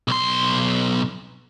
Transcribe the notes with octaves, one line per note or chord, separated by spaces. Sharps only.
B1 C6